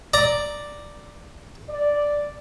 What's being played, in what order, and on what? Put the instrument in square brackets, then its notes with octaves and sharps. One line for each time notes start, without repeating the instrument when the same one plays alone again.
[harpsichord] D5 A#5
[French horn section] D5